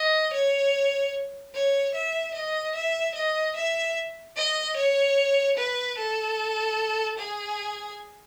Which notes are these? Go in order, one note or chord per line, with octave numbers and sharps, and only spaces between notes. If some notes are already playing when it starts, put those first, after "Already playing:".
Already playing: D#5
C#5
C#5
E5
D#5
E5
D#5
E5
D#5
C#5
B4
A4
G#4